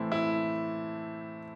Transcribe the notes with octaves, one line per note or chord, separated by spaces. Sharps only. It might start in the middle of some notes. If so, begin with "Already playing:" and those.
Already playing: A2 E3 A3 C4 E4
E4